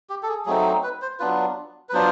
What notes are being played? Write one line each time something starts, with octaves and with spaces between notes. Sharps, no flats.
G4
A4
G#4
F#3 A3 C4 D#4 G#4
B4
C5
F#3 B3 D4 F4 B4
B4
F#3 B3 D4 F4 C5